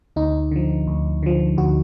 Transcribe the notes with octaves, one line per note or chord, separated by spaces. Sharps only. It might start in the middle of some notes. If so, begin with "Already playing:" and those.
D2 D#4
D3 F3
D2
D3 F3
D2 F#4